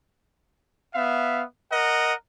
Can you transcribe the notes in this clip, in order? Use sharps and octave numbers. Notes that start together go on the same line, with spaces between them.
B3 E5 F5
A#4 D#5 F#5